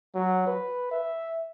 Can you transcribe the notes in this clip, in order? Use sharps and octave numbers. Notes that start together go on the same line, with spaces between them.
F#3
B4
E5